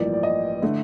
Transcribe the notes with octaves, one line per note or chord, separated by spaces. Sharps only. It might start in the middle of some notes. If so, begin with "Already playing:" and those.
Already playing: A1 G2 F3 A#3 D5
D5
D#5
D3 A3